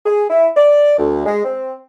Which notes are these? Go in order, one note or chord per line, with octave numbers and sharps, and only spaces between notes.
G#4
E4
D5
D2
G#3
C4